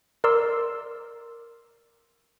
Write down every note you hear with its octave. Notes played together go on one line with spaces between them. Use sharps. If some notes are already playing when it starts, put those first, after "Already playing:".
A#4 D5 C6 E6